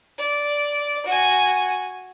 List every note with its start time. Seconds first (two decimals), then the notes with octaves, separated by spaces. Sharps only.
0.19 D5
1.06 F#4 G#5